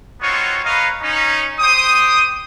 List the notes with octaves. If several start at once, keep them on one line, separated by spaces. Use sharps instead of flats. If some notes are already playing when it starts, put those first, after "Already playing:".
B3 C4 D#4 F4 F#4 C#5
A#4 B4 C#5 D#5 F5
C#4 D#4
G4 C5 G5 D#6